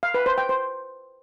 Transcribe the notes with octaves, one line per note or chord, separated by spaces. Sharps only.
F5
B4
C5
G5
C5